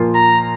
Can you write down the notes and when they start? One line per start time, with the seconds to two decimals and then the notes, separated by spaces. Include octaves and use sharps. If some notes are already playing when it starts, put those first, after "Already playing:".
Already playing: A#2 F3 A#3 F4
0.15 A#5